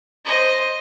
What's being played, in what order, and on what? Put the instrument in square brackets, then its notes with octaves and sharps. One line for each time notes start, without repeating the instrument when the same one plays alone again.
[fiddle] C5 D#5